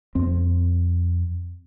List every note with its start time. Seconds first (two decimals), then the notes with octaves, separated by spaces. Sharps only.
0.15 F2 C4